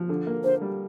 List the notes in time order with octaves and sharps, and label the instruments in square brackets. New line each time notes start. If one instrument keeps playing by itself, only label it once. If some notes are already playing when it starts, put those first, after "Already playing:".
Already playing: [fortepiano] F3
D3
A#3
[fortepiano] D3 [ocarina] C5
[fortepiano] G3